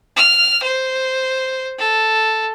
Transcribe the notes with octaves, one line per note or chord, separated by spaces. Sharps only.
F6
C5
A4